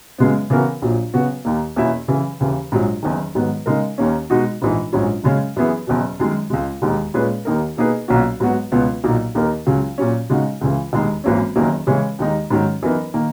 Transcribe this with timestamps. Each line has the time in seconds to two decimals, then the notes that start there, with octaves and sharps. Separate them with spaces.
0.18 F#2 C#3 G#3 B3
0.50 C#3 E3 B3 F#4 A#4
0.82 A#1 A#2 F#3
1.14 C#3 F#3 B3 F#4
1.45 D#2 D#3 A#3
1.76 E2 B2 A#3 C#4 E4
2.08 F#2 C#3 E3
2.40 D#2 C#3 E3
2.72 A#1 G#2 F#3
3.03 F#1 E2 D#3
3.35 G#2 D#3 F#3 B3
3.66 C#3 G#3 D#4 A#4
3.98 D#2 D#3 A#3 C#4
4.30 B2 G#3 D#4 F#4
4.62 A#1 G#2 E3 G#3 D#4
4.93 A#1 G#2 F#3 C#4
5.24 F#2 C#3 G#3 C#4
5.56 F#2 E3 B3 E4 G#4
5.87 F#1 E2 B2
6.20 F#2 D#3 G#3
6.50 C#2 C#3 G#3
6.82 E1 D#2 D#3 G#3
7.14 A#2 G#3 C#4 G#4 B4
7.45 D#2 D#3 A#3 D#4 A#4
7.77 B2 A#3 D#4 G#4 B4
8.08 B1 A#2 A#3 C#4 F#4
8.40 G#2 F#3 B3 F#4
8.72 C#2 B2 F#3 B3
9.03 B1 A#2 F#3 A#3 D#4
9.35 D#2 D#3 A#3 D#4 A#4
9.66 C#2 C#3 F#3
9.98 A#2 F#3 C#4
10.30 C#3 G#3 D#4 F#4
10.61 C#2 C#3 E3
10.93 E1 D#2 D#3 G#3 D#4
11.24 G#1 F#2 E3 A#3 C#4
11.56 F#1 E2 D#3 F#3 A#3
11.87 C#3 E3 G#3 C#4
12.18 D#2 D#3 G#3 D#4
12.50 G#2 D#3 F#3 C#4
12.83 F#2 E3 B3 D#4 A#4
13.14 D#3 A#3